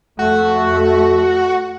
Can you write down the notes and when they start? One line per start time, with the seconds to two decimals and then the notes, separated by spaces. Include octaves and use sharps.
0.19 F2 A3 F#4